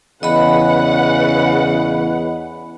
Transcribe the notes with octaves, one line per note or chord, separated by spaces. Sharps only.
E2 C#3 B4 D#5 F#5 B5